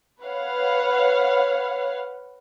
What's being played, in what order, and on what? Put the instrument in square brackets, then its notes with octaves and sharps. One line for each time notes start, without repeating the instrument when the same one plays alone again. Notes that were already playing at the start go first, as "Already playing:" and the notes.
[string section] B4 C#5 F5 F#5